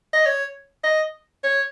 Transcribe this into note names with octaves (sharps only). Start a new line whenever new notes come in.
D#5
C#5
D#5
C#5